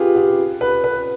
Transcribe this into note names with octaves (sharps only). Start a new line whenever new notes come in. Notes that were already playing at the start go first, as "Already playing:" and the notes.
Already playing: F4 G4 G#4 B4
G4
B4
B4